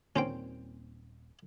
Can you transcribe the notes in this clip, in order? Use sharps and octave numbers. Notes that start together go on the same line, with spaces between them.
D#1 A#2 C4 C#4 C5 G5